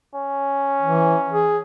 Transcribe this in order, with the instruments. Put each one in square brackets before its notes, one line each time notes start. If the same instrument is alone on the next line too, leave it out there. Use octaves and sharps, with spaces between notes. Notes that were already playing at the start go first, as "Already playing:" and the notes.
[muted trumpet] C#4
[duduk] E3
G#4